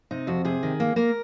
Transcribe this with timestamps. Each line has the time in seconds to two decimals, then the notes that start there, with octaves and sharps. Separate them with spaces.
0.11 C3 D#4
0.27 F2 F#4
0.45 C3 G#4
0.63 D#3
0.80 A#3
0.96 A#3 A#4